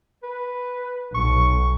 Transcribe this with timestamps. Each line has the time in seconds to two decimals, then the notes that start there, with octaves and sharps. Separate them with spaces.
0.23 B4
1.15 B1 C#6